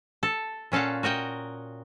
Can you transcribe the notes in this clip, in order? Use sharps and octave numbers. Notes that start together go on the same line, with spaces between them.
A4
A#2 C#4 A4 F5 F#5
F#4 A#4 D#5 G5